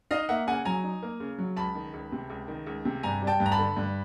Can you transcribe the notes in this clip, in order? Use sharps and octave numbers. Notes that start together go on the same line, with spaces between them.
D#4 D#5 F5
A#3 E5 F#5
C#3 F#5 G#5
F#3 G#5 A#5
D#4
A#3
C#3
F#3
C#2 A5 B5
D#3
C#2
C3
C#2
D#3
C#2
C3
G2 G#5 A#5
G3
G5 A5
G2
A#5
A5 B5
D3
G2